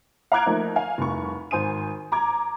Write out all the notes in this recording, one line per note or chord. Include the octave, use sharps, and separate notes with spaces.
F5 A#5 D6 F#6 G#6 D7
F3 A3 A#3 D#4
F5 G#5
F1 C2 C#6
G#1 C5 G#5 D#6 D#7
A#5 D6 G#6